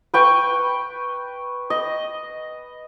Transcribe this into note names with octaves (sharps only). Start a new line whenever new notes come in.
B4 G5 C#6
D#5